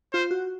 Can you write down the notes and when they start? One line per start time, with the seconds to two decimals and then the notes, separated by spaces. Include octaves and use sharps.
0.13 F4 C5
0.31 F#4